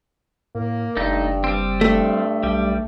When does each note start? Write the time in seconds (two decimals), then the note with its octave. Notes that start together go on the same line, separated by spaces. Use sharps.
0.55 A2 A#3
0.97 F#1 G2 A3 D#4
1.44 G3 C4
1.81 G2 A3
2.43 B1 G3